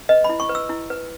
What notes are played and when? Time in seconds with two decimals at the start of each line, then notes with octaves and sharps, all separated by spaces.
0.09 B4 D#5
0.24 B5
0.29 E4
0.40 C#6
0.49 B4
0.55 E6
0.69 E4
0.90 B4